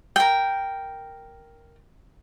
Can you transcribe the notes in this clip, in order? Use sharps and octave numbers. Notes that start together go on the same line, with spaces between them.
A#4 G5